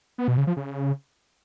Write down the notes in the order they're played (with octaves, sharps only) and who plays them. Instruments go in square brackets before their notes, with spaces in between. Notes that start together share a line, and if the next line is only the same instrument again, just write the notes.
[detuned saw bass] B3
B2
C#3
F3
C#3